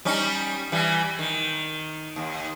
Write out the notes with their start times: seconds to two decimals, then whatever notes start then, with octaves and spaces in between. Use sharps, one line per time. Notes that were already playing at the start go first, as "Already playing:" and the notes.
0.05 G3 C#4 D#4
0.72 E3 G3
1.19 D#3
2.16 D#2